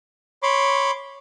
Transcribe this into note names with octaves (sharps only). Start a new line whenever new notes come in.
C#5 B5 C6 D6